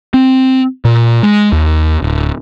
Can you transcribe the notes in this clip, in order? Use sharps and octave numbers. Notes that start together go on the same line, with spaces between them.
C4
A#2
G#3
D#2
D1